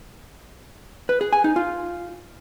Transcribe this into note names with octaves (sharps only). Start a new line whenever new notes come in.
B4
G#4
G#5
D#4
F4